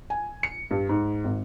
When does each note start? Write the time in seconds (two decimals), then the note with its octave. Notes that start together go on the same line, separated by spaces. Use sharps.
0.10 G#5
0.43 C#7
0.71 G2
0.89 G#2
1.24 G#1